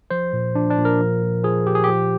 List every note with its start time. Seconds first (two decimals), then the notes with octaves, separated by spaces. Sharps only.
0.10 F3 C5
0.33 A#2
0.55 F3 D4
0.70 D4
0.77 A#2
0.85 A#4
1.00 F3
1.22 A#2
1.44 F3 G#4
1.67 A#2 G4
1.75 G#4
1.84 F3 G4